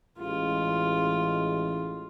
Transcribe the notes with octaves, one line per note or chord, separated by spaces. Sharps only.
A1 G#3 F4